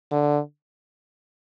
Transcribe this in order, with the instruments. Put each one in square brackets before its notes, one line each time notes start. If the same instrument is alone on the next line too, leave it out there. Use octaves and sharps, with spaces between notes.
[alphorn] D3